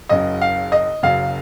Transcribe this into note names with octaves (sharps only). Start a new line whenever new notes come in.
F#1 F#2 C#3 D#5
F5
D#5
F#1 F#2 C#3 F5